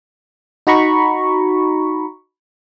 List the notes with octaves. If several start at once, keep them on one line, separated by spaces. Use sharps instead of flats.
D#4 F#4 A#5 B5 C#6